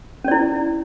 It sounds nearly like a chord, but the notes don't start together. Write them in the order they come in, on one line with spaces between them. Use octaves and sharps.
C#4 D5 E4